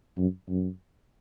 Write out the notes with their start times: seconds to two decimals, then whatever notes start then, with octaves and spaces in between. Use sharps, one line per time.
0.18 F#2
0.49 F#2